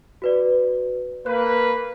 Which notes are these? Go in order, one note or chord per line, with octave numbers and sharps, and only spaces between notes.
F#4 B4 D5
A#3 B4 F#6